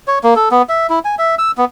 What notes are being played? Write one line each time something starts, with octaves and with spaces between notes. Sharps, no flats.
C#5
A#3
A4
B3
E5
E4
G#5
E5
E6
B3